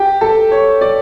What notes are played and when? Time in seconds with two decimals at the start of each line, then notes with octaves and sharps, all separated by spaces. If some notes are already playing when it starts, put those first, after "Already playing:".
Already playing: G4 G5
0.21 A4 A5
0.51 C#5
0.81 D5